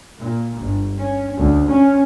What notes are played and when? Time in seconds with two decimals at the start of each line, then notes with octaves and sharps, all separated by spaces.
0.17 A#2
0.57 G1
0.96 C#4
1.37 D2
1.69 C#4